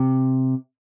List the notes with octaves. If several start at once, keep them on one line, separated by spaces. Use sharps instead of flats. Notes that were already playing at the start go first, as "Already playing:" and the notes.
Already playing: C3